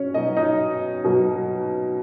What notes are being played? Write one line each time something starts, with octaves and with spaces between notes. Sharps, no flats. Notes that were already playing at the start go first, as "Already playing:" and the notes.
Already playing: B2 F#3 C#4 C#5
B2 F#3 D#4 D#5
D#4 D#5
B2 F#3 D#4